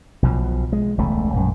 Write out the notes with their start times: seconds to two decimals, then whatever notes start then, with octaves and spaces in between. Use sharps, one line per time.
0.22 B1 B2 F3
0.72 G#3
0.98 E1 C#2 A3
1.34 A#1 F#2